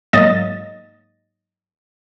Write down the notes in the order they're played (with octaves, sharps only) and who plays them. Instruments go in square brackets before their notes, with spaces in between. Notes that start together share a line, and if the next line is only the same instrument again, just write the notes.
[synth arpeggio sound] G#2 F#3 A#3 D#5 A6